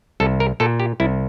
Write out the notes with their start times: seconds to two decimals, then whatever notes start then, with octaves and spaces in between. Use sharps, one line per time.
0.20 C2 A4
0.40 A#4
0.60 A#2 A4
0.80 G4
1.00 C2 E4